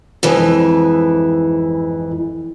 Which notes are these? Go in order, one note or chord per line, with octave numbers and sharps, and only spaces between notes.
F2 G#2 E3